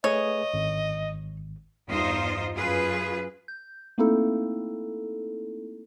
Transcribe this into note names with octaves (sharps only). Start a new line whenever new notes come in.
A3 G#4 B4 C#5 D#5
G#1
E2 G2 D#4 F4 C5 D#5
F#2 F4 G#4 B4
G6
A3 A#3 C4 D#4 E4 A4